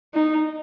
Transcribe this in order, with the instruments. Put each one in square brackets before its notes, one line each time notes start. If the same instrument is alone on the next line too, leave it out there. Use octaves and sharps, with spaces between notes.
[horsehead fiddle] D#4